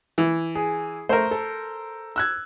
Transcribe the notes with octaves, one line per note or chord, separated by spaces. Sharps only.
E3
G#4
A3 A#4 C5
A4
E6 F#6 G#6